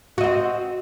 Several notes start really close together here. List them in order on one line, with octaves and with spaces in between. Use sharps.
F#4 D#5 C4